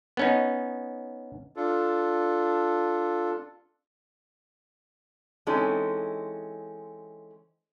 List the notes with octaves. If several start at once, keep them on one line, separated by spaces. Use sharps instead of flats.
B3 C#4 D#4
D4 F4 A4
E3 G#3 C4 C#4 D#4 A4